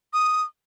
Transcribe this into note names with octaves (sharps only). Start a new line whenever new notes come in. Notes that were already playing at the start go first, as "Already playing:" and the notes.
D#6